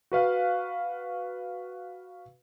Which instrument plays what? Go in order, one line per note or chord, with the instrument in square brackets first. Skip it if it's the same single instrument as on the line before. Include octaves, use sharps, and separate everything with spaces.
[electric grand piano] F#4 B4 F5